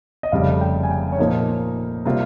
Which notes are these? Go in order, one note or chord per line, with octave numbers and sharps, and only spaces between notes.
D#5
F1 F2 C#3 G3 F5
G5
G#5
G5
C#5
A#2 F3 A#3 D#4 D#5
C3 G3 A#3 F4